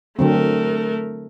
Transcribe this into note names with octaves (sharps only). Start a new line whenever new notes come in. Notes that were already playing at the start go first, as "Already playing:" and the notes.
D3 F#3 A3 C4 A#4